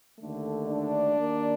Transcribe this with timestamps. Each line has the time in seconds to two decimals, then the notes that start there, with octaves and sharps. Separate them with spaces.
0.20 D#2 D3 A3
0.68 D4 D5
1.16 D#2 D#3 A#3